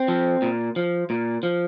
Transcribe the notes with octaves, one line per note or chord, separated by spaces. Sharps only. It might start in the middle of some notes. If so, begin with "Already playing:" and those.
Already playing: C4
F3
A#2
F3
A#2
F3